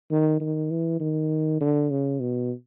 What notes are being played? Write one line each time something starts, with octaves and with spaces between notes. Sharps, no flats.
D#3
D#3
E3
D#3
D3
C#3
B2